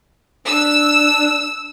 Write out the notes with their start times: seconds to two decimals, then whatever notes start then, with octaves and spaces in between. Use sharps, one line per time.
0.47 D4 E6